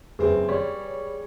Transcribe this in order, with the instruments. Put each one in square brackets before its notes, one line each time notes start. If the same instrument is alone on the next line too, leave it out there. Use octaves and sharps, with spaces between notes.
[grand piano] F#1 C4 [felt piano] G#4 B4
[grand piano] G3 [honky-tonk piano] C#5